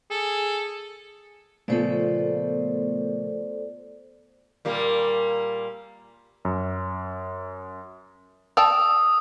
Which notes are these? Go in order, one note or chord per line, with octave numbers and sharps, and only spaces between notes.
G#4 A4
A#2 C#3 F3 A3 B3 A4 C5 D5
A#2 G3 A#3
F#2
D5 G5 A5 D#6 E6